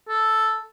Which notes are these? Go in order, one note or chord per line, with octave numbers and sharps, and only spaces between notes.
A4